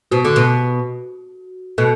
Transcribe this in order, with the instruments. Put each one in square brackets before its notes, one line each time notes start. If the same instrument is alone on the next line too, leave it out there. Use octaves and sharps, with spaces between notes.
[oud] B2 [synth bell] F#4
[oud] D3
B2
[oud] B2 [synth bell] A4